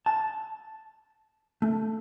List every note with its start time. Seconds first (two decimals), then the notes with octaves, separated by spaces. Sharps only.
0.06 A5
1.62 A3